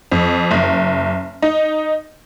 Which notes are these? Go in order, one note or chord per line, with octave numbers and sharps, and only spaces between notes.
F2
F#1
D#4